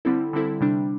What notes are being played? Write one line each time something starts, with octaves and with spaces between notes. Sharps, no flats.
D3 G3 C4 E4 A4
D3 G3 C4 E4 A4
C3 G3 D4